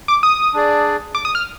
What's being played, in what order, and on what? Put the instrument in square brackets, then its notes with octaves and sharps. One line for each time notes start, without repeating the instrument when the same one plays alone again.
[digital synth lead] D6
D#6
[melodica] D4 G#4 D5
[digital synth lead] D6
D#6
F6